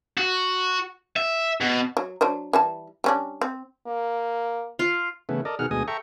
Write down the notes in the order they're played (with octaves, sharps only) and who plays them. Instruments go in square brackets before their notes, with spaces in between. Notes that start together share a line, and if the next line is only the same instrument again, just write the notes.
[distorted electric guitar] F#4
E5
B2
[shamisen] F#3
F#3 D4 C5
E3 G3 A5
G3 C#4 D4
C4
[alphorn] A#3
[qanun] F4
[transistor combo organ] C#3 E3 A3 B3
A4 A#4 D5 D#5
B2 D#3 G#4 F#5 F6
D2 B2 G#3 D#5 G#5 D#6
A4 E5 G5 A#5 C#6